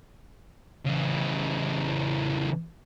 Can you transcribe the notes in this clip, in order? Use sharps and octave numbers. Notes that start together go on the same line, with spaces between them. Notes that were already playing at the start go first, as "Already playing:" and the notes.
C#3 E3